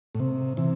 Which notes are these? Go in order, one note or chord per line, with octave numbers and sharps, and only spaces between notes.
A2
C3
C3 E3